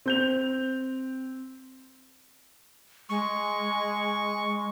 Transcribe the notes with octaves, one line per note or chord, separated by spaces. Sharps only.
C4 G6 F7
G#3 C#6